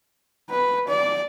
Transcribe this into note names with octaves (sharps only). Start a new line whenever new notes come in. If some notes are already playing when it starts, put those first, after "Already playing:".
B4
D5